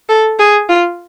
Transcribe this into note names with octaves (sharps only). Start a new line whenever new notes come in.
A4
G#4
F4